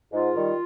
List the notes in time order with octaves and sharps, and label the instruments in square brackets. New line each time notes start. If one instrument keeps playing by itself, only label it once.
[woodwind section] G#2 F4
D#3 G3